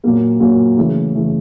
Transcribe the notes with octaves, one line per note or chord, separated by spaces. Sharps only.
A#2 F#3 A#3
A#2 F#3 A#3
C#3 E3 A3
C#3 E3 A3